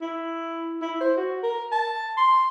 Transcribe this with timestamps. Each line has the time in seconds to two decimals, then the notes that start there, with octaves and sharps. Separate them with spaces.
0.02 E4
0.82 E4
1.01 C5
1.17 F#4
1.43 A#4
1.72 A5
2.17 C6